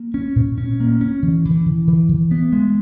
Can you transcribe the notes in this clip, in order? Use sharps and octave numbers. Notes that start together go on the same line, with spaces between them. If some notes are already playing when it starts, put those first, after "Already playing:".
Already playing: A#3
C#4
A#2
C#4
A#3
C#4
E3
E3
E3
E3
E3
B3
G#3